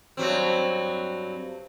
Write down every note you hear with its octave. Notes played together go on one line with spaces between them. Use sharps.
G2 F#3 C4